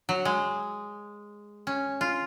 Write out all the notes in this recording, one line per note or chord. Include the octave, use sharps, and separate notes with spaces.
F#3
G#3
C#4
F4